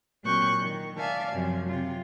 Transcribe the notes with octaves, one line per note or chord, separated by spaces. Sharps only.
A#2 F#3 C4 C#6 F#6 G6
D#3
D5 E5 F5 G#5 A5
F#2 C3 F3
C3 F4